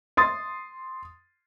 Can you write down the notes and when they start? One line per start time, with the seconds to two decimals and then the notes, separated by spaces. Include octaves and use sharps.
0.17 C6 D#6 A6